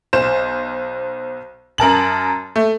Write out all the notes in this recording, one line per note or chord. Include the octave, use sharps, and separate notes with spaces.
B1 C5 E7
F#2 A#4 A5 F#7
A3